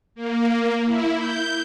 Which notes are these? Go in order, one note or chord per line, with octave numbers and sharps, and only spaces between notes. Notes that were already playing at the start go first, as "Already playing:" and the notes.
A#3
E4
G6